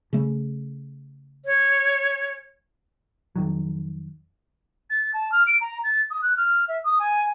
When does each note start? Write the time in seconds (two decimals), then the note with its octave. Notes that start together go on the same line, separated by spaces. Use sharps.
0.13 C#3 A3
1.45 C#5
3.36 F2 D#3 F#3
4.90 A6
5.13 A5
5.31 F6
5.46 D7
5.61 A#5
5.84 A6
6.10 D#6
6.22 F#6
6.37 F6
6.68 E5
6.84 D#6
6.99 G#5